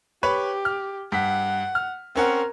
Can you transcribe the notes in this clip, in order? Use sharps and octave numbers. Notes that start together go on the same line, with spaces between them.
G4 B4 C#5 B5
F6
G2 F#5 B6
F6
C4 C#4 A#4 F#5